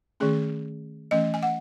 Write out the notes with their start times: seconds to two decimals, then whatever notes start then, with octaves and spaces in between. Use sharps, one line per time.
0.20 D#3 A3 C#4 G#4
1.11 E3 A3 C#4 D#5
1.34 G#5
1.43 F#5